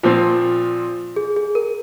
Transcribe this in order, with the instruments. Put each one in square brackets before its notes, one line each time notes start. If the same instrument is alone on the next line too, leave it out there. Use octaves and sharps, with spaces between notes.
[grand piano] A#2 F3 C4 [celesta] F4
[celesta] G#4
G#4
A#4